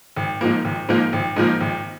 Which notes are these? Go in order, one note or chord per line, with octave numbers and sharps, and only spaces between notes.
G#1
G#2 F3 A#3
G#1
G#2 F3 A#3
G#1
G#2 F3 A#3
G#1